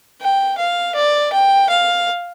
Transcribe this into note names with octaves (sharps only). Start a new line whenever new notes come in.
G5
F5
D5
G5
F5